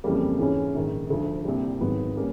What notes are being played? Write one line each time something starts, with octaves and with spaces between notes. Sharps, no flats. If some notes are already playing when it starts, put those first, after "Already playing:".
F2 C#3 E3 G3 A#3
G#2 E3 G#3 C#4
A#1 G#2 D#3
D2 D3 F3
C2 A#2 G3
G#1 G#2 D#3 F#3 B3
G3 A#3 C#4